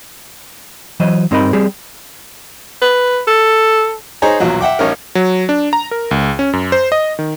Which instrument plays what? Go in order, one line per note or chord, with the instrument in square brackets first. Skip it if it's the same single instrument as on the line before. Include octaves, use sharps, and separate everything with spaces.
[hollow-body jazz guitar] E3 F#3 C5 D#5
G2 C4 D#4 A#4 D#5 B5
G3 C4 G4 G#4
[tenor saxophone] B4
A4
[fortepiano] D#4 G#4 C5 C#5 G#5 A#5
B1 E2 A#2 F#3
E5 F#5 G5 D6
A1 C#4 D#4 A#4
[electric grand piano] F#3
D4
A#5
A#4
C#2
C#4
F#2
C5
D#5
D#3